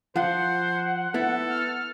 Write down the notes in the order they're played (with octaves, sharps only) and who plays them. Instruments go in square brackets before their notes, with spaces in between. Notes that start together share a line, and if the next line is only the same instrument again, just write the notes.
[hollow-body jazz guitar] F3 F4 [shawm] C5 [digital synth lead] F#5
[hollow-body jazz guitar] B3 E4 [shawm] A4
[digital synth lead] F6